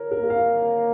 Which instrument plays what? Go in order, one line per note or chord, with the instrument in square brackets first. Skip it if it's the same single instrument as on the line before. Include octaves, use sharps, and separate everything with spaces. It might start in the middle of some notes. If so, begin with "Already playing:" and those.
Already playing: [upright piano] A#4 C#5
A#4
[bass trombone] A#3
[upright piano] F5